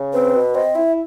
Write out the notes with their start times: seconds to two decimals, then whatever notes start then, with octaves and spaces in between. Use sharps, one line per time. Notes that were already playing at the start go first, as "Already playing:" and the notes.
Already playing: C#3
0.13 C4 B4
0.35 B2
0.55 C4 D#5
0.75 E4 E5